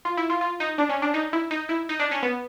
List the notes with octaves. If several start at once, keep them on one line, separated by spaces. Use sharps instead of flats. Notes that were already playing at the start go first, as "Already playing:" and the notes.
F4
E4
F4
F4
D#4
D4
C#4
D4
D#4
E4
D#4
E4
D#4
D4
C#4
B3